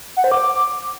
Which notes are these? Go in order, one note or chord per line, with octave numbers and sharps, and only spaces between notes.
F#5
C5
D6